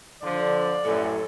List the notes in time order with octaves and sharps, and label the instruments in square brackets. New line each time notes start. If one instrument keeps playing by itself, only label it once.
[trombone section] D3 F3 [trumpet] D5
[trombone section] A1 F#2 [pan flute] A4